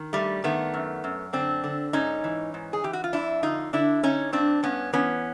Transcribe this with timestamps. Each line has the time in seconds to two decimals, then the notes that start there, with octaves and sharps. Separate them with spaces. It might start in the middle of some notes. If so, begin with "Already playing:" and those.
Already playing: D#3
0.13 G2 G3 A3
0.44 D#3 A3 B3
0.74 F#2
1.04 F#2
1.33 D3 C4 D4
1.64 D3
1.93 G#2 C#4 D#4
2.24 E3
2.54 G#2
2.73 G#4
2.84 E3 G4
2.93 F#4
3.04 F4
3.13 F2 D4 E4
3.43 D3 D#4 F4
3.73 D3 D4 E4
4.03 D3 C#4 D#4
4.33 G2 C4 D4
4.63 G2 B3 C#4
4.93 E3 B3 C#4